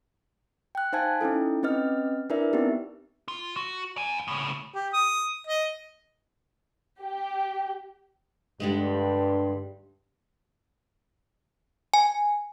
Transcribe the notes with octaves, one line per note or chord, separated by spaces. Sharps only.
G5 F#6
D#4 C5 F5 G#5 A5 G#6
C#4 D#4 E4 A4
C4 C#4 B4 D#5 F6
D4 E4 A#4 B4 D5 E5
B3 C4 D#4 G4
F4
F#4
F#5 G#5
A2 C#3
G4
D#6
D#5
G4
G2 D3 G3 G#3
G#5